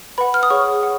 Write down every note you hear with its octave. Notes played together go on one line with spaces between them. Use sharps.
B4 F#5 B5
F6
D#6
G#4 C#5 F#5 C#6
F#5